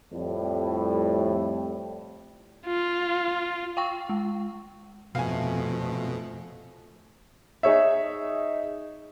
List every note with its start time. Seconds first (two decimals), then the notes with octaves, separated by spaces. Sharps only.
0.13 F2 A2 G3
2.66 F4
3.77 F5 G5 C#6
4.09 G#3
5.15 F2 B2 F3 A3 F5 G#5
7.63 D#4 G#4 C#5 E5